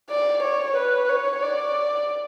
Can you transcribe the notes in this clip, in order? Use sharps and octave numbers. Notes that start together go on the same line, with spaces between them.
D5
C#5
B4
C#5
D5